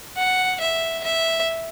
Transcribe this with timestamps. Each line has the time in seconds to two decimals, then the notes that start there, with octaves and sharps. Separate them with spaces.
0.17 F#5
0.61 E5
1.04 E5